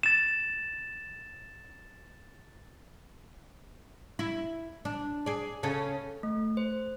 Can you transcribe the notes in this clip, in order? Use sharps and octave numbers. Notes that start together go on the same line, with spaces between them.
A6 E7
E4
D4
G#4 D5
C#3 C#4 A4
A3
C5